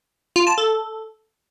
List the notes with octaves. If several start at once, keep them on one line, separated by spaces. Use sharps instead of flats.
F4
A5
A4